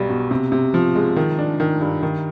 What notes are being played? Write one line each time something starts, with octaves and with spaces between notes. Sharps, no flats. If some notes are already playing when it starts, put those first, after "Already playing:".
Already playing: B1 G3 B3
B2
C3
C3
F3
G#3
D#3
D4
D#3
G2
D#3